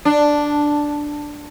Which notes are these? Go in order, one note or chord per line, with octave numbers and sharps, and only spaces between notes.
D4